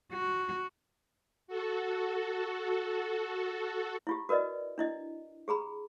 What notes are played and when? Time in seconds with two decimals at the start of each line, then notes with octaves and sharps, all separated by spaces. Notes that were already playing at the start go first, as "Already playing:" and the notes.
0.13 F#4
1.47 F#4 A4
4.07 E4 F4 G4
4.29 F#4 A#4 B4 D5 D#5
4.78 D4 E4 D#5
5.48 G4 G#4 A#5 B5